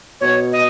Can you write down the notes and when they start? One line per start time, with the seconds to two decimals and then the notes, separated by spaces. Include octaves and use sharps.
0.21 B2 C#5
0.53 D#5